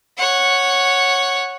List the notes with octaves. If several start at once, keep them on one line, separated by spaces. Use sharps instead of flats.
C#5 F#5